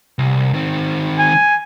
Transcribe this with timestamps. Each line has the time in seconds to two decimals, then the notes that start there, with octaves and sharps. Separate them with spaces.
0.19 C2
0.54 D#3 C4
1.19 G#5